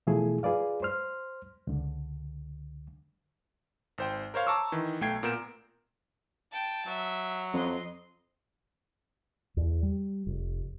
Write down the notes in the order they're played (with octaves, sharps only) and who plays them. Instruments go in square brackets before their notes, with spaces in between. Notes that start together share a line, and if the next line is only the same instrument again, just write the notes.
[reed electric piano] B2 E3 F3 A3 E4 G#4
F4 G#4 B4 D5 F5
C5 C6 F6
C#2 D3
[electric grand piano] G#1 C5 G5
A#4 C5 C#5 F5
A5 A#5 C#6 D6 E6
D#3 E3
B1 A3 G5 G#6 C7
A#2 B3 A#4 G6 D7 E7
[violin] G5 A5
[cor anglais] F#3 [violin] E5
[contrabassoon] F2 [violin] D#5 C6
[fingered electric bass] E2
G3
F1